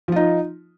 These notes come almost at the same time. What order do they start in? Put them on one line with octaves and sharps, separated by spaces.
F3 F4 D#4